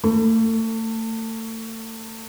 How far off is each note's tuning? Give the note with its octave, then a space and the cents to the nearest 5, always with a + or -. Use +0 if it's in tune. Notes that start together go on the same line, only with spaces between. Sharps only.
A3 +35